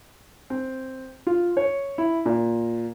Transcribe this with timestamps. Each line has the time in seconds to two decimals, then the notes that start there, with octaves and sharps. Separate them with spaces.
0.50 C4
1.27 F4
1.57 C#5
1.98 E4
2.26 A#2